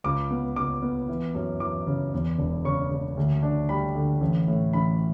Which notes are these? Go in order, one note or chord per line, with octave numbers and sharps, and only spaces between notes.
C#2 D6
B3
C#2 D6
B3
E3
F#2
E3 D6
C#3
E2
E1
C#3 C#6
C#3
D2
D4
G3 B5
D3
A1
A2
A1 B5